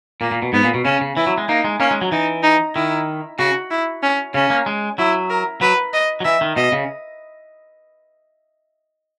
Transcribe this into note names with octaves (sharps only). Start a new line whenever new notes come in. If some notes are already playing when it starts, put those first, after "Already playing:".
A#2 A#3
A#2
B2
G#2 B3
A#2
B2
C#3 C#4
C#3
E3 E4
F#3
G#3
A#3 D#4
G#3
A#3 C#4
G#3
F#3
E3 D#4
D#4
D#3 E4
C#3 F#4
E4
C#4
C#3 C#4
A#3
G#3
F#3 E4
A#4
F#3 B4
D#5
F#3
E3 E5
D#3
B2 D#5
C#3